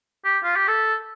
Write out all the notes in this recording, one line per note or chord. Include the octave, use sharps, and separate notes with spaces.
G4
F4
G4
A4